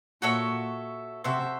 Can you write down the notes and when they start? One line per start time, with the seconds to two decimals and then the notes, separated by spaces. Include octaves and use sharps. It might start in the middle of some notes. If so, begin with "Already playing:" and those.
0.22 A#2 F#4 A4 C#5 E5
1.24 C3 F#4 A4 C5 E5